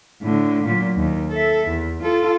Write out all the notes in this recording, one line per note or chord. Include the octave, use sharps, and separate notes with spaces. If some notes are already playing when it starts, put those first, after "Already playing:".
A2 D3
A#2 F#3
D#2
A4 E5
E2
F4 A4